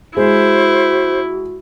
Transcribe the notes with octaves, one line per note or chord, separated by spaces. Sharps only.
G#3 E4 F#4 C5